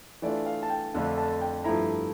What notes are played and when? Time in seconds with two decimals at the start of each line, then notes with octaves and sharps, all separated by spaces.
0.22 E3 A3 D4 F4 D5
0.46 F5
0.63 A5
0.70 G5
0.94 F2 D3 A3 D4 F4
1.18 A5
1.41 G5
1.64 G2 F3 A3 E4 A#5